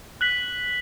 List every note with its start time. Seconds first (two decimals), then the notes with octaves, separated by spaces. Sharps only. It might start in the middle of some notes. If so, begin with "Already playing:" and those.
0.21 F#6 B6 F#7